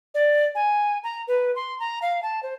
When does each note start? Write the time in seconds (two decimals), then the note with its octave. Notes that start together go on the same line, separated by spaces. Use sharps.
0.14 D5
0.55 G#5
1.04 A#5
1.28 B4
1.56 C6
1.80 A#5
2.02 F5
2.23 A5
2.43 C5